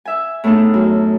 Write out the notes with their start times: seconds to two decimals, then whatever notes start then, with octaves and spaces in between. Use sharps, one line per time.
0.05 E5 G#5
0.44 A2 A3 B3 D4 D#4 G#4
0.74 F#2